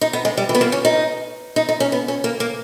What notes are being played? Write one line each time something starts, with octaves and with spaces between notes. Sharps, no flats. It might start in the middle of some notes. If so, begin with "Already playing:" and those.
D#4
B3
G#3
G3
E3
B3
A#3
C#4
D#4
D#4
D#4
C#4
B3
C#4
A#3
A#3